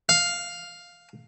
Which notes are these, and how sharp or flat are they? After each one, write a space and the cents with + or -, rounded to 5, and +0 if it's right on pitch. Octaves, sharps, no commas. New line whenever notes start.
F5 +5